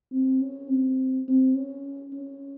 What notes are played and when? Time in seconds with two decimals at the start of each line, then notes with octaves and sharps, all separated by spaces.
0.12 C4
0.41 C#4
0.70 C4
1.28 C4
1.56 C#4
2.14 C#4